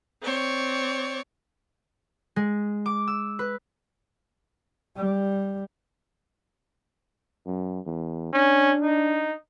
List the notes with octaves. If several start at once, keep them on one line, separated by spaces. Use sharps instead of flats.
C4 C#5 D5
G#3
D6
E6
B4
G3
F#2
E2
C#4 D4
D#4